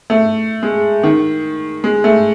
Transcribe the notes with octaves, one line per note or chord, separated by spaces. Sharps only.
A3
G#3
D#3
G#3
A3